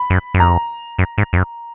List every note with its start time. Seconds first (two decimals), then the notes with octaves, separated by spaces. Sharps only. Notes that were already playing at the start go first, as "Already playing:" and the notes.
Already playing: B5
0.10 F#2
0.34 F#2
0.40 F2 A#5
0.99 F#2
1.18 G#2
1.33 F2
1.37 F#2